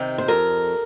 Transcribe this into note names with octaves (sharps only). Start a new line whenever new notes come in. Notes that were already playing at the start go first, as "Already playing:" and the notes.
Already playing: C3 D#3
C5
F2 A#4